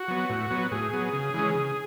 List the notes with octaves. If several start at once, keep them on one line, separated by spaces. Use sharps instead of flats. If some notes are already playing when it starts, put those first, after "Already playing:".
Already playing: F#4
F#3 B3
A2
F#3 B3
A2 G#4
F#3 B3
C#3
E3 G#3 C#4
C#3